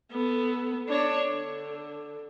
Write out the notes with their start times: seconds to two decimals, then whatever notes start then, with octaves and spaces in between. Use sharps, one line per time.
0.11 B3 A4
0.88 D4 C#5
1.32 D3